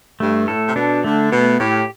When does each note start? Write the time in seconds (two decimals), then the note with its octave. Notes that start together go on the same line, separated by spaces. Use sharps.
0.20 G2 A3
0.48 A2 A4
0.67 C3
0.76 B2 D4
1.04 D3 A3
1.32 B2 B3
1.60 A2 G4